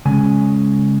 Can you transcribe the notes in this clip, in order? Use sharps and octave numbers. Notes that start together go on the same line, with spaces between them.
C#3 G#3 C#4 G#5